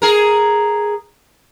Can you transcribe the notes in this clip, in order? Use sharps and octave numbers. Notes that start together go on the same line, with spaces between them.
G#4 A#4